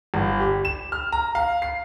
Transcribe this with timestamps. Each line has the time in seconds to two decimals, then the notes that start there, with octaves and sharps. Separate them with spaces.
0.14 G1
0.40 G4
0.65 E7
0.92 F6
1.12 A#5
1.35 F5
1.62 C7